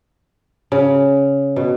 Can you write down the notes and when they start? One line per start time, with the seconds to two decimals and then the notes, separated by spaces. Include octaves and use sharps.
0.72 C#3
1.56 B2